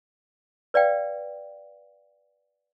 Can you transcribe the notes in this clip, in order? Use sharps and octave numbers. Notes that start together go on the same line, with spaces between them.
B4 D5 F5 G5